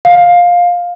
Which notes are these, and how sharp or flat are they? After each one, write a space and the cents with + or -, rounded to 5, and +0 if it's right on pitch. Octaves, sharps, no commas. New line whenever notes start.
F5 +15